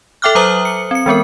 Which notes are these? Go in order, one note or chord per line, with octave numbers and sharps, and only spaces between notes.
A4 E5 G5 D6 F6 F#6
F#3 C5 A#5 D#6 F#7 G7
C#7
C4 C#7
E3 G#3 B3 A#4